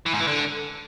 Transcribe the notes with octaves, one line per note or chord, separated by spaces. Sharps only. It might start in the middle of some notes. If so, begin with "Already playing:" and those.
E3
G#2
E3
D3